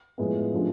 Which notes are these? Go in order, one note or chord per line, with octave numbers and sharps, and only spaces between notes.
A2 F3 G#3 B3
C#3 F3 A3 D4 G4